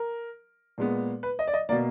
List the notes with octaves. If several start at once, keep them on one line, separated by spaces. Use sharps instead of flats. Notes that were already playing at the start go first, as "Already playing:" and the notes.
Already playing: A#4
A#2 G#3 B3
B4
D#5
D5
D#5
B2 A#3 D5